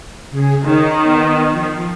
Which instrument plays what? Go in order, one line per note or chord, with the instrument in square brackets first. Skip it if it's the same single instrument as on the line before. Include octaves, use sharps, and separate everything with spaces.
[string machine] C#3 G#4
[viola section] D#3 [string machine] C#5
[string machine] B3
F3